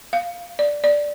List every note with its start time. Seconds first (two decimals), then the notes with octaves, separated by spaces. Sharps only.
0.13 F5
0.59 D5
0.84 D5